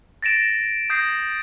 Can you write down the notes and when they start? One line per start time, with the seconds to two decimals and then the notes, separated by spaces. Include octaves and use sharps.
0.23 A6 A#6 D7 E7
0.90 D#6 G6 A#6 C7